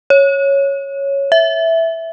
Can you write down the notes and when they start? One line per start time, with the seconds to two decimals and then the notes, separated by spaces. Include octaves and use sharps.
0.10 C#5
1.32 E5